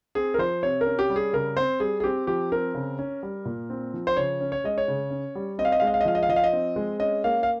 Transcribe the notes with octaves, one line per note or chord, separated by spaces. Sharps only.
C4 G#4
A#4
F3 C5
C3 C#5
A#4
C#4
G4
G3
G#4
C#3 A#4
C4 C5
G3 G#4
G#4
C4 G4
F3 G4
C4 A#4
C#3
C#4
G3
A#2
C4
F3
C5
C#3 C#5
C#4
C#5
G#3 D#5
C#5
C#3
C#4
G3
C4 D#5
F5
D#5
G#3 F5
D#5
F5
D#5
F3 F5
D#5
F5
F3 D#5
F5
D#5
C4
G#3
C#4 D#5
A#3 F5
F5